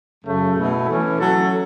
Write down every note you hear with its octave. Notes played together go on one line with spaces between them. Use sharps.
F#2 C#3 F#3 A3
B2 A3 E4
E3 A3 C#4
F#3 C#4 A4